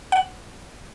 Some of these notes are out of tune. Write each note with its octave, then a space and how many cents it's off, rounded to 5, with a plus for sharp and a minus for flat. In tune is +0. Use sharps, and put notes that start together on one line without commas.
F#5 +5